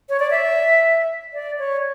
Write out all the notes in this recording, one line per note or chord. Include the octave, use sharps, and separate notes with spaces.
C#5
D5
E5
D5
C#5